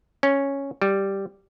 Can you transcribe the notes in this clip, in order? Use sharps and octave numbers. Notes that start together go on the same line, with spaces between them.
C#4
G3